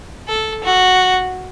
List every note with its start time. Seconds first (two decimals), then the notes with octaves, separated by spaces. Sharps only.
0.28 A4
0.64 F#4